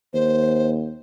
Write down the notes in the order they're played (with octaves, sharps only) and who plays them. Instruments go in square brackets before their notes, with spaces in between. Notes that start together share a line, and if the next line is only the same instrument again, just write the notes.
[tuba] D#2 [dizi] C5